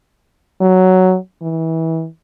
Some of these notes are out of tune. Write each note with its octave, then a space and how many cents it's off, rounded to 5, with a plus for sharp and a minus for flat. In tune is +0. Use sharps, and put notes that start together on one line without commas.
F#3 +5
E3 -25